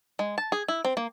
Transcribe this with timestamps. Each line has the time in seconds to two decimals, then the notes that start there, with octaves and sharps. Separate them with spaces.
0.19 G#3
0.38 A5
0.52 G#4
0.68 E4
0.85 C4
0.97 A#3